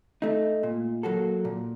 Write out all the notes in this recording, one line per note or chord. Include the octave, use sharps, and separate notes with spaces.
A3 D#4
A#2
F#3 A#3 F#4 A4
A#2